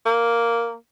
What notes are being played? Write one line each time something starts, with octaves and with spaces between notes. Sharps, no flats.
A#3